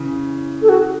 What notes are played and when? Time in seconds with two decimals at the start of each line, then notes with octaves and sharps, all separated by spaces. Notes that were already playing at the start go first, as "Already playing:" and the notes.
Already playing: C#3 E3
0.62 A4
0.69 F#4